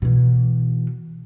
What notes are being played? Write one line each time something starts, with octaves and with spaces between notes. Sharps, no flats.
B2 E3